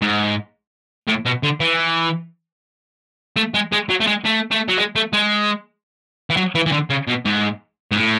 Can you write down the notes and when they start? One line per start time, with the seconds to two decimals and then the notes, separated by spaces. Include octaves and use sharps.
0.02 G#2
1.07 A2
1.25 B2
1.43 D3
1.60 E3
3.36 A3
3.54 G#3
3.72 G#3
3.89 F#3
4.01 A3
4.07 G#3
4.25 A3
4.51 A3
4.68 F#3
4.78 G#3
4.96 A3
5.13 G#3
6.30 E3
6.37 F#3
6.55 E3
6.66 E3
6.72 D3
6.90 C#3
7.07 B2
7.25 G#2
7.91 G#2
7.95 A2